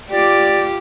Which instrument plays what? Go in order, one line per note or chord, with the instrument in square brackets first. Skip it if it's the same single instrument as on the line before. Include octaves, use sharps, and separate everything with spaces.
[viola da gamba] F4 G4 [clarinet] D5